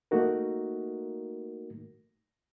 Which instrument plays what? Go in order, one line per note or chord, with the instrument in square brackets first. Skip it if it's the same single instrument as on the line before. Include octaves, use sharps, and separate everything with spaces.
[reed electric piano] A3 A#3 D#4 F#4 A#4